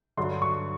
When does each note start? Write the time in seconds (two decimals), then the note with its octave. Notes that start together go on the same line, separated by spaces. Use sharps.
0.17 G2 D3 F#3 C6
0.42 C#6